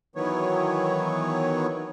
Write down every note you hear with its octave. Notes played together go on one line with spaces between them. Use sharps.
D#3 E3 F#3 B3 C#5